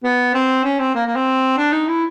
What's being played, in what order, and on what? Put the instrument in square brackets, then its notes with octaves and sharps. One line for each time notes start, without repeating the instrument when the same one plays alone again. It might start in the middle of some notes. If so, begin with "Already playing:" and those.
[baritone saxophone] B3
C4
C#4
C4
A#3
A#3
C4
D4
D#4
E4